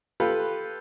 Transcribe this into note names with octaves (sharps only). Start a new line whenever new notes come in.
F4 G4 A4 B4